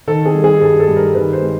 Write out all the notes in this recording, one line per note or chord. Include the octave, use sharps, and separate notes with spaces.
D#3 A4
G#4
G3
G#4
G2 A4
A4
G2
A#4
D#3 B4
C5
G#3